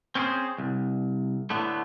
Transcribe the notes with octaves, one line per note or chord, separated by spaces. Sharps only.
C4 C#4 E4 G4 G#4 C5
C2
A2 D3 A3 B3